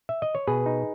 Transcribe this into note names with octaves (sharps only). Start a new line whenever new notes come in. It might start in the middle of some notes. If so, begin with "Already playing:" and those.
E5
D#5
C#5
B2 G#4 B4
D#4